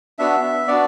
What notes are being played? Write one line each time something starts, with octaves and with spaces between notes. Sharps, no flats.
B3 D4 F#4 E5
B3 D4 F#4 D5